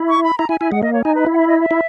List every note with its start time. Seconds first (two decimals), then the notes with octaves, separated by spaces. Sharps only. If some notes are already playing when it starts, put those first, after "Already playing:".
Already playing: E4
0.09 C#6
0.23 B5
0.38 E4 A#5
0.49 E4 G#5
0.60 E4 G#5
0.72 G#3 F#5
0.83 A#3 D#5
0.93 C#5
1.04 D#4 G#5
1.15 B4
1.26 E4
1.33 F#5
1.37 E5
1.48 D#5
1.60 E5
1.71 E4